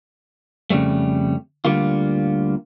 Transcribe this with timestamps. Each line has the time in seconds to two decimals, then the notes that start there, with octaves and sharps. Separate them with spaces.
0.70 F2 C#3 F#3 G3 A3
1.65 D2 D3 G3 A#3 F4